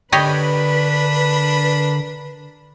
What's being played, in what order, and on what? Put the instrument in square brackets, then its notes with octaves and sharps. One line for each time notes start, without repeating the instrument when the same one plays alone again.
[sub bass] D3 [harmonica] D4 A#4 B5 [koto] G4 C#5 D#5 [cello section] B4